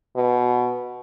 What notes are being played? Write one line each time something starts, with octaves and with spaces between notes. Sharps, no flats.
B2